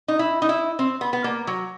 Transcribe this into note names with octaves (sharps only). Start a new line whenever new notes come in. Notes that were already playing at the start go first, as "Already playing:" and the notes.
D#4
E4
D#4
E4
C4
B3
B3
A#3
F#3